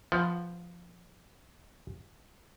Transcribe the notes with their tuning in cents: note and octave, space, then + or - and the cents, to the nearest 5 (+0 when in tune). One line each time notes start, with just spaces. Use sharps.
F3 +0 B3 +15